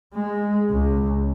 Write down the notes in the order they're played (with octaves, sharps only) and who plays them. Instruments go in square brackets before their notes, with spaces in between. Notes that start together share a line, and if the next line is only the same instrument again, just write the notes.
[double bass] G#3
C#2